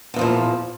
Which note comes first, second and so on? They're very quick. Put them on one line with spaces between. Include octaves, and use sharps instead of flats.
D3 E2 F3 A#2